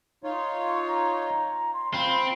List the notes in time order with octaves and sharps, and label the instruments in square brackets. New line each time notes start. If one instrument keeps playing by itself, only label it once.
[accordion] D#4 F4 C#5
[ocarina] C#6
A#5
C6
[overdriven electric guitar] C4 [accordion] F4 [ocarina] B5